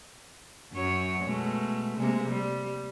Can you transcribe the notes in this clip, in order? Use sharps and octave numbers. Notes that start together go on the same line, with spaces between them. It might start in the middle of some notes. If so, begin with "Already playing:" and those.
F#2 F#3 C#5
B2 G#3 A3
C3 G#3 A#3
G3